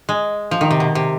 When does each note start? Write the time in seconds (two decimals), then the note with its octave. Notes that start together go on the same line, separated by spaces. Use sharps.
0.09 G#3
0.51 F3
0.61 D#3
0.71 C3
0.80 B2
0.95 C3